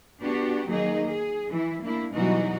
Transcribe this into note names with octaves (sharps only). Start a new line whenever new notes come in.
B3 D4 F#4 G4
D#3 F#3 A#3 D#4 G#4 D#5
G#4
E3 E4
A#3 D4 E4
B2 E3 F#3 G3 D#4 F#4